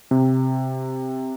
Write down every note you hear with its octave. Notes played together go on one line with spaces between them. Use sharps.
C3